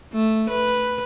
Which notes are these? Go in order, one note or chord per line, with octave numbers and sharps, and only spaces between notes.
A3
B4